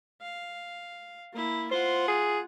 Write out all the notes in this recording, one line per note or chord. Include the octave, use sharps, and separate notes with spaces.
F5
A#3 E4
F4 C5 F#5
G#4